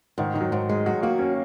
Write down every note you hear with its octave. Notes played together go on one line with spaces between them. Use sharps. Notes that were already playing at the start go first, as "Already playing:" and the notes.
G#2 D#3
D#3 D#4
F#3
G#2
G#3
F#3 F#4
A#3 F#4
C#4